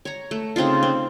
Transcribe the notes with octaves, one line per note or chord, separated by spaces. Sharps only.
C#5 A#5
A3
C#3 C4 D#4 F4
C4